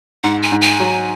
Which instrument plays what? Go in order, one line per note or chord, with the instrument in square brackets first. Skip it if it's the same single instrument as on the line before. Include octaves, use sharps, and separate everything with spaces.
[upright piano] G#2 [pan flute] F#5
[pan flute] G#5
[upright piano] G#2
[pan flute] G#5
[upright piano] F#3